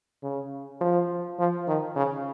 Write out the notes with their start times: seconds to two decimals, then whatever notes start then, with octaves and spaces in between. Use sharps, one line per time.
0.23 C#3
0.81 F3
1.39 F3
1.68 D#3
1.96 C#3